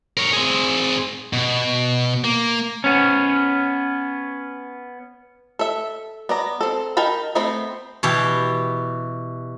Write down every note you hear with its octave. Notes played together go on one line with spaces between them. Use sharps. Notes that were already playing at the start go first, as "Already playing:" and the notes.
A#4 C#5
C4 G#4
B2
A#3
B3 C#4
A4 E5
B3 D5 A#5
C4 A4
D#4 A#4 G5 A5 B5
A3 B3 C4 C5 B5
B2 E3 G4